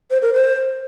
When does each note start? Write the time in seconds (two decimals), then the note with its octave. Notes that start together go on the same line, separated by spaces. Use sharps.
0.11 C5
0.22 A#4
0.34 C5